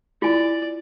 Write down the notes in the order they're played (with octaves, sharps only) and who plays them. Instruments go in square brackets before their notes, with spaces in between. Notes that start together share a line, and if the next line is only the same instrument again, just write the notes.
[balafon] E4 [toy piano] F4 G#5 [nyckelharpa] D5